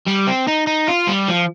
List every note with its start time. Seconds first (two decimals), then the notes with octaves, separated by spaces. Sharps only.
0.06 G3
0.27 C4
0.48 D#4
0.67 D#4
0.88 F4
1.08 G3
1.29 F3